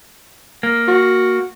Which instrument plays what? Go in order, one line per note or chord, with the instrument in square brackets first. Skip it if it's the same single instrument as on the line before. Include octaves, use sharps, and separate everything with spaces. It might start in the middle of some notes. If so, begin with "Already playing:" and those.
[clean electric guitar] A#3
[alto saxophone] F#4